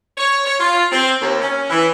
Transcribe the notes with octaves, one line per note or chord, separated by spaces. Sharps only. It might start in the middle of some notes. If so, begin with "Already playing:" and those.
C#5
C#5
F4
C4
D#2
C#4
E3